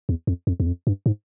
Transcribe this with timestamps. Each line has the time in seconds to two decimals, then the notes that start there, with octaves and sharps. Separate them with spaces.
0.09 E2
0.27 F2
0.47 F2
0.60 E2
0.66 F2
0.87 G2
1.06 G#2